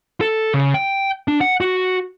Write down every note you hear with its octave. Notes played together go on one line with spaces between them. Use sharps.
A4
C#3
G5
D4
F#5
F#4